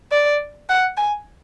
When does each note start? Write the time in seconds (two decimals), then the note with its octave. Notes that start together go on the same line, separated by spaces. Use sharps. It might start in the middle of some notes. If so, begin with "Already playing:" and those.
0.12 D5
0.69 F#5
0.97 G#5